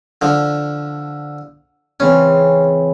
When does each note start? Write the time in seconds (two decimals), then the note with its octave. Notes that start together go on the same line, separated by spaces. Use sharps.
0.21 D3 F3
2.00 C#3 E3 C4 C#4